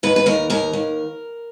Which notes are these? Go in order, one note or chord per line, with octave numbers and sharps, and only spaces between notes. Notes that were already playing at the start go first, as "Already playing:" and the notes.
D#2 B4
B4
D#2 A#4
D#2 A#4
D#2